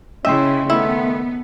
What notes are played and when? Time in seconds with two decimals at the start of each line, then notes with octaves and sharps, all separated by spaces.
0.25 C#3 C#4 E4 D#5 E5 G5 C6
0.70 D#3 A3 B3 E4